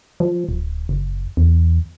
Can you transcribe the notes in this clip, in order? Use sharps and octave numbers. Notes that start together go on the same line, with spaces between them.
F3
D1
F#1
E2